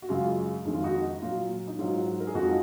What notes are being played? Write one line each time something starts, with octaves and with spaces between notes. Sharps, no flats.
F#4
F#2 C#3 G#3 F4
F2 D#3 G#3 D#4
F4
D#4 F#4
A#2 F#3 F4
D#4
G#2 F#3 F4
A#4
G#4
F2 F3 G#3 D#4 F#4